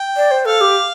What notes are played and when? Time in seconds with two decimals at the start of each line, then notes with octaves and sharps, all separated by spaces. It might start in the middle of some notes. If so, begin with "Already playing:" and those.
Already playing: G5
0.17 D5
0.31 C5
0.45 A4 F5
0.61 G4